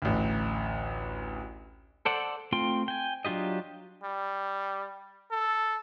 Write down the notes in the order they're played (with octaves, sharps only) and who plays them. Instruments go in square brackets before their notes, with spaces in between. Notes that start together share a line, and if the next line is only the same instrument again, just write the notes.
[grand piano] A1 D2
[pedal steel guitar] A4 C5 D5 F#5
A3 C4 F4 G5 C6
G5 G#5
F#3 D4 F4 G4 D#5
[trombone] G3
A4